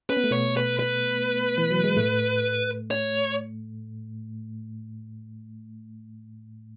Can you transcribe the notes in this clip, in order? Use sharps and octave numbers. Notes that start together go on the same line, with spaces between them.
C#4 B4
B3
A3
B2 B3 C#5
B4
B4
E3
F#3
G#3
A2 A3
C#5